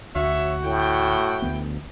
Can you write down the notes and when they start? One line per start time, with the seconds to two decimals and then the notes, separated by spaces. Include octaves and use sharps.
0.15 D2 F#4 C#5 E5
0.64 A2 E4 G5
1.42 D2 G#3 B3